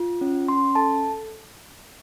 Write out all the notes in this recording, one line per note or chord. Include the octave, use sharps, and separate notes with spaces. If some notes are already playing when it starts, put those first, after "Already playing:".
Already playing: F4
C#4
C#4 C6
A4 A5